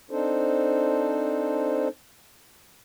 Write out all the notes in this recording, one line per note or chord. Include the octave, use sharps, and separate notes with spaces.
C4 D4 D#4 A4 C5